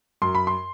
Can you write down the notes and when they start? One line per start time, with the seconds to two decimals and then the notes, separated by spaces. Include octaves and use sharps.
0.22 F#2 C6
0.35 B5
0.47 C6